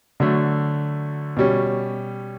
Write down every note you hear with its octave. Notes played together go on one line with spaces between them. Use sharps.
D3 F#3 A3
B2 G3 C#4